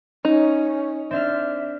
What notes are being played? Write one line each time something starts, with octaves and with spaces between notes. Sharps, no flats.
C#4 D#4
C4 D4 E5 F6